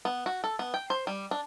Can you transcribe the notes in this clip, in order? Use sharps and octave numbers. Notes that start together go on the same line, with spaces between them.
B3
F#4
A4
B3
G5
C5
G3
D4